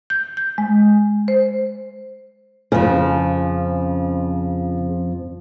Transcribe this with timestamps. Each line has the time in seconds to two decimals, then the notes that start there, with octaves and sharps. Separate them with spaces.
0.10 G6
0.37 G6
0.58 G#3
1.28 C5
2.72 F2 C#3 F3